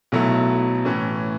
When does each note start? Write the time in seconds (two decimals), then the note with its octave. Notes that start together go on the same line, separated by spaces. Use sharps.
0.12 B1 B2 F#3 A3 E4
0.85 A2 E3 C#4